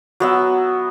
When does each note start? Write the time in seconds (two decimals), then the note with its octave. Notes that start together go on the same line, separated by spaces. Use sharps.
0.20 F#3 B3 E5